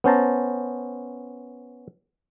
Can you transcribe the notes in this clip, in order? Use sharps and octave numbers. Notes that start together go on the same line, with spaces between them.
B3 C#4 C5 A5 A#5